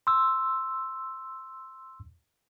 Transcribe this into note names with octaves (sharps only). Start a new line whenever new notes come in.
C6 E6